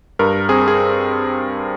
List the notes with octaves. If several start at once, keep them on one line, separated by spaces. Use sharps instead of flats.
G2 A#4
C4 G#4
G#4